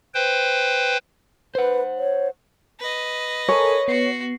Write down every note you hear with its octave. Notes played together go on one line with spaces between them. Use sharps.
B4 C5 G5
B4 C5 F#5
C#5
B4 D#5
A4 A#4 C#5 G#5
B3 F#4 C7